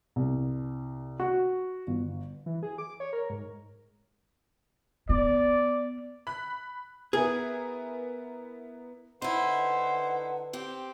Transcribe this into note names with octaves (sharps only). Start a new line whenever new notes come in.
C2
F#4
G1
E3
G#4
D6
C#5
A#4
G#2
B3 D5
B5 F#6
B3 E4 G#4 A#4
D3 D#4 E4 B4 C5 F#5
C4 G4 G5